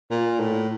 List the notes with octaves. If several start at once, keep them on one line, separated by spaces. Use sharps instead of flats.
A#2
A2